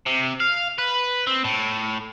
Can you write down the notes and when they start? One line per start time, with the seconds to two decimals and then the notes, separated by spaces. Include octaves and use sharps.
0.06 C3
0.40 F5
0.78 B4
1.27 C4
1.44 A2